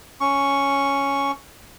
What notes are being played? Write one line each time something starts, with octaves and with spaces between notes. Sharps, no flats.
C#4 C#6